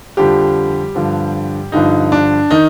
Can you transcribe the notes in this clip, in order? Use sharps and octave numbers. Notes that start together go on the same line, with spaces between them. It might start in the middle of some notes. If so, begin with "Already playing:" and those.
F2 D3 F3 G3 G4
G2 D3 F3
G2 D3 F3 D#4
D4
D#3 D#4